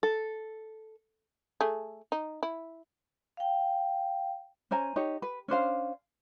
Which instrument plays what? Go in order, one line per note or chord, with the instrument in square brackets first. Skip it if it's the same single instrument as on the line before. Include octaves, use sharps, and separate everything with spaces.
[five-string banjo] A4
[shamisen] A3 G#4
D#4
E4
[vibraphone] F5 G5
[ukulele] C#4 C5 G#5 A#5
D#4 G4 C#5
B4
C#4 D4 C5 F5